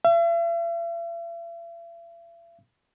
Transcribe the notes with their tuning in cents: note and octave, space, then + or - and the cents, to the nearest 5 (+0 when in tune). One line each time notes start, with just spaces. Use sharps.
E5 +45